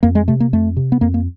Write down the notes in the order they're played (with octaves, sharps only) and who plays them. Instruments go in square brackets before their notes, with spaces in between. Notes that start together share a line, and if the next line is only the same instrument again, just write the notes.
[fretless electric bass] F2 A#3
G#3
C3 A3
A#3
F2 A3
C3
B3
F2 A#3
A#3